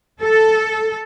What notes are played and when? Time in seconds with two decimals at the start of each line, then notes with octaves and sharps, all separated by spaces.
0.21 A4